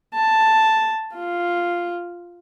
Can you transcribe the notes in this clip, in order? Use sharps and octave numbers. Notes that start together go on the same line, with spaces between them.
A5
F4